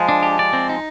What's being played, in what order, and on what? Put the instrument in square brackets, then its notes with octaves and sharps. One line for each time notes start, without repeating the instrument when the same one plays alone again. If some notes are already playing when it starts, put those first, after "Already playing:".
Already playing: [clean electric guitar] F3 G#3
[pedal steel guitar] D4
G4
D5
C4
D#4